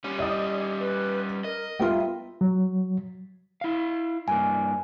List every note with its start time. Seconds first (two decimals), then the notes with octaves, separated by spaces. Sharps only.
0.04 G3 C#4
0.18 D5 D#5 D#6
0.80 B4
1.44 A#4 D#5
1.79 G3 B3 F4 A#4 E5 G5
2.41 F#3
3.61 E4 F5
4.28 G2 A#3 G#5